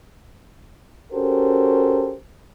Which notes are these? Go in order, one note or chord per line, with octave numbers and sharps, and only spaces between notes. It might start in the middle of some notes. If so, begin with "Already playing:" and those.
C#4 F#4 G4 A4 A#4 C5